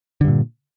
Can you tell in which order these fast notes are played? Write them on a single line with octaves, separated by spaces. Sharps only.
D3 G2 A#2